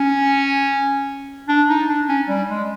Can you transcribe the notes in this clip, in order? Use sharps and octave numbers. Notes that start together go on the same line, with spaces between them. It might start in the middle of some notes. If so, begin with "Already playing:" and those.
Already playing: C#4
D4
D#4
D4
C#4
G3
G#3